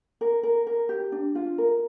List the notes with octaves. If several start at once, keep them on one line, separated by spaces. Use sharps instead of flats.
A#4
A#4
A#4
G4
D4
F4
A#4